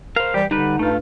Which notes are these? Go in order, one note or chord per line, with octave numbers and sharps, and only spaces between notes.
A#4 C5 F5
E3 G3 G4
D3 G3 D#4 B4
G2 A3 F4